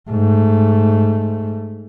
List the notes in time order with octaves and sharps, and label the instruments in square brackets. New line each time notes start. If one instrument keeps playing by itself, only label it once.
[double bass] G#2 A3